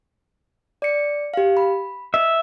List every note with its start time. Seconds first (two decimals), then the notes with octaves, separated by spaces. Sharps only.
0.82 D5 C#7
1.34 G4 F5
1.57 B5
2.14 D#5 E5